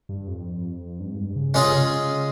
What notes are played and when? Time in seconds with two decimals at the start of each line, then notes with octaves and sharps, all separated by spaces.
0.09 G2
0.28 F2
1.00 G2
1.12 G#2
1.18 G2
1.36 C#3
1.54 C3 G#3 C#4 F4 G#4
1.72 C#3
1.91 C#3
2.09 C#3